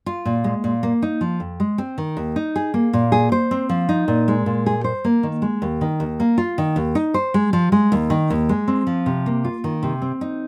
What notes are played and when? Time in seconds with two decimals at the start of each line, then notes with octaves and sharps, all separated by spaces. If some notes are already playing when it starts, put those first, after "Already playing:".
0.06 F4
0.25 A#2
0.44 G#3
0.64 A#2
0.83 A#3
1.02 D#4
1.21 F3
1.40 F2
1.60 G#3
1.78 C4
1.98 D#3
2.17 D#2
2.36 D#4
2.56 G#4
2.74 A#3
2.93 A#2
3.12 G#4
3.32 C5
3.51 C4
3.69 F3
3.89 D#4
4.08 A#2
4.28 G#3
4.46 A#2
4.66 G#4
4.84 C5
5.05 A#3
5.23 D#3
5.42 G#3
5.62 D#2
5.81 D#3
6.00 D#2
6.20 A#3
6.38 F4
6.58 D#3
6.76 D#2
6.95 D#4
7.14 C5
7.34 G#3
7.53 F3
7.72 G#3
7.92 D#2
8.10 D#3
8.30 D#2
8.49 G#3
8.68 C4
8.87 F3
9.06 C3
9.26 A#3
9.44 F4
9.64 D#3
9.83 C3
10.02 C4
10.21 D#4